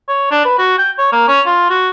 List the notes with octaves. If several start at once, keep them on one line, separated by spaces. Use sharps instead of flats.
C#5
D4
B4
F#4
G5
C#5
A#3
C#4
F4
F#4